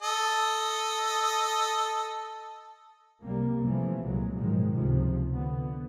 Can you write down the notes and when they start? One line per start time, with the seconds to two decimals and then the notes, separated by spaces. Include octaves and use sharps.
0.02 A4 D#5
3.24 C2 C3 G3 A#3
3.61 C3 E3 F3 A3
4.03 C2 A#2 F#3 G#3
4.36 G#2 B2 D#3 F3 G#3
4.74 C#2 C3 F3
5.33 D3 B3